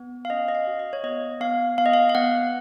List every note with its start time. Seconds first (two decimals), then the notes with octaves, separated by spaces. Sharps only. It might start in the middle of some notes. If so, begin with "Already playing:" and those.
Already playing: B3
0.25 F5
0.30 C#4 D#5
0.48 D#5
0.55 F5
0.67 F#4
0.79 D#5
0.93 C#5
1.04 B3 D#5
1.40 B3 F5
1.78 B3 F5
1.86 D#5
1.94 F5
2.09 F5
2.15 B3 F#5